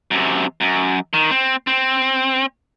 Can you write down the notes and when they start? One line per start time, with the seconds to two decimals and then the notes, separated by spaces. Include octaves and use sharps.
0.11 F#2 C3
0.61 F#2
1.14 D#3
1.30 C4
1.67 C4